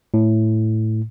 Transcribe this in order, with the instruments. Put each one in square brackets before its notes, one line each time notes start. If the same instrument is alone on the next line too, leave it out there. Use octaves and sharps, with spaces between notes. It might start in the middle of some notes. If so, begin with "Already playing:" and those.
[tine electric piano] A2